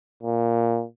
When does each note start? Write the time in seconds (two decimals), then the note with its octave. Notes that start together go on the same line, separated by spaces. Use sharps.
0.23 A#2